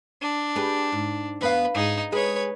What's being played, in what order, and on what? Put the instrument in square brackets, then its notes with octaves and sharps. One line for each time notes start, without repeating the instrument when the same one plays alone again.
[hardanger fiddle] D4
[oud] G4 G#4 B4
G#2
[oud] E2 B3 F5 [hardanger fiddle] B4
[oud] G#2 [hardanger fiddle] D#4 G#4
[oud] G#3 G#4 [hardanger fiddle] B4 C#5